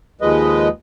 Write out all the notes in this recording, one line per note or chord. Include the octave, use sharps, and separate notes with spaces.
D#2 F3 G#3 B4 D#5